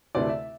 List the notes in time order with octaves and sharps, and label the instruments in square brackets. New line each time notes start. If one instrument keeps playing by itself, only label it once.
[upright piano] D2 C3 E3 A3 D5
E5